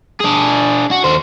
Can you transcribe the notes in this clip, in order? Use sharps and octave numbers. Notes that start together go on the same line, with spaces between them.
D4 G#4
F#4
D#2 C5